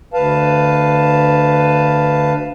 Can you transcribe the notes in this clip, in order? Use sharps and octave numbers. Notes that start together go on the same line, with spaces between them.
D2 B4 F5 A5